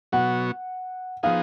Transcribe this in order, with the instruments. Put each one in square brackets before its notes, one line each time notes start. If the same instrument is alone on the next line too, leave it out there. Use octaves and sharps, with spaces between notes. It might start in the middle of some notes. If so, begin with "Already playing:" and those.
[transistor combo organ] B2 F#3 B3 F#4 [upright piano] F#5
[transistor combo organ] F3 B3 D#4 G#4 [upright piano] F5